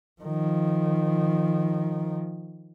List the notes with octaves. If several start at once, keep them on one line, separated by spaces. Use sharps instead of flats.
D#3 F3